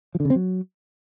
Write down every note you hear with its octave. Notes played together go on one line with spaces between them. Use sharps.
F3
D3
C#3
C4
F#3